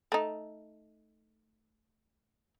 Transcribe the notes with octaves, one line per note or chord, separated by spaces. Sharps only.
A3 D#4